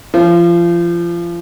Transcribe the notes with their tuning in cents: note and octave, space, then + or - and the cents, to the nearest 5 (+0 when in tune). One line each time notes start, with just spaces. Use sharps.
F3 -30